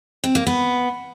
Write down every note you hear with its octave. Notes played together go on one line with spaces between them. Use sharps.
C4
A#3
B3